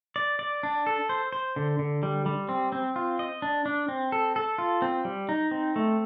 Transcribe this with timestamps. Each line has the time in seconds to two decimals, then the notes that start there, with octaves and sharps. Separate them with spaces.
0.16 D5
0.39 D5
0.63 D4
0.87 A4
1.09 C5
1.32 C5
1.56 D3
1.79 D3
2.03 G3
2.26 G3
2.49 C4
2.72 C4
2.96 F4
3.19 D#5
3.42 D4
3.66 D4
3.88 C4
4.12 A4
4.36 A4
4.58 F4
4.82 C4
5.05 G3
5.29 D#4
5.51 C4
5.76 A3